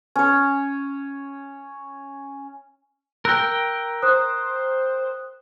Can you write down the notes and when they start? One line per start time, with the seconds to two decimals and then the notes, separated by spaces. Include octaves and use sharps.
0.16 C#4 C#5
3.25 A#4 G5 E6 F#6 G6
4.02 C5 D#6 F#6